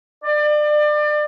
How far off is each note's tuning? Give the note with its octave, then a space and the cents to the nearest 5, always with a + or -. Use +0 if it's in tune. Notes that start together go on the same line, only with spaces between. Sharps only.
D5 +30